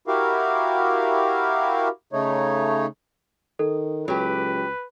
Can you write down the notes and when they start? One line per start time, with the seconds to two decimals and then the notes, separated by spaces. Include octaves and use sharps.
0.08 E4 F#4 G4 A#4 F5
2.13 C#3 A3 D#4 C#5
3.59 D#3 A4
4.08 C#2 F#3 G4 B4